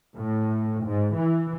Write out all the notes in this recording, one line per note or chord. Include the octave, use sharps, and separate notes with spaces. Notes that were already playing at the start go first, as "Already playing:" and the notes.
A2
G#2
E3